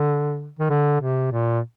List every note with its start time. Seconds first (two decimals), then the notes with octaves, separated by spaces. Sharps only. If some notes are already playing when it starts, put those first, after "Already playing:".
Already playing: D3
0.59 D#3
0.70 D3
1.01 C3
1.32 A#2